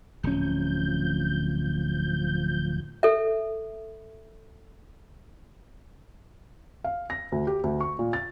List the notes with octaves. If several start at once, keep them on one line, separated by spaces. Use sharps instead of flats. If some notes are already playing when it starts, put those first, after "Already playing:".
D1 D2 F3 C#4 G6
A4 E5
F5
A#6
D2
G4
D2
C#6
A#2
A6